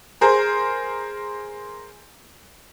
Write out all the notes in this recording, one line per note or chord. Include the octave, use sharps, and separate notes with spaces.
G#4 A#4 C5